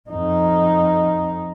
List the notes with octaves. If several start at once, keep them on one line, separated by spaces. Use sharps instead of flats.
F2 D#4